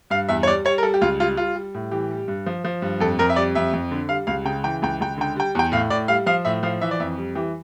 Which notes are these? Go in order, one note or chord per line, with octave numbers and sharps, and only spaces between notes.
G2 F5
E2 E5
C#5
G3 D5
G3 C#5
A#4
G3 A4
G4
C#2 F4
G3 F4
G3 F4
G3
A2
E3 G4
G3
G2
F3
F3
G2
F2 A4
F2 A#4
E5
G3 D5
F2 E5
F2
D3
G3 F5
C#2 F5
C#3 G5
E3 G5
C#2 G5
C#2 G5
D3 G5
G3 G5
E2 G5
A2 F5
A2 D5
G3 F5
F3 F5
A2 E5
F3 F5
E3 E5
D5
F2 E5
G3
E3 G4